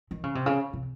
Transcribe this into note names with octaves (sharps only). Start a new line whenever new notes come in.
D#3
C#3
C3
C#3
C3